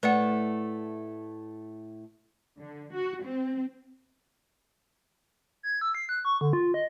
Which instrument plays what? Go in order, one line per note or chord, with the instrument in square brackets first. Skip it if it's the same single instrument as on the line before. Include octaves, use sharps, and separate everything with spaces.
[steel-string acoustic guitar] A2 A3 [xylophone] B4 D5 F#5
[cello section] D3
F#4
C4
[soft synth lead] G#6
E6
C7
F#6
C#6
D3
F4
D#5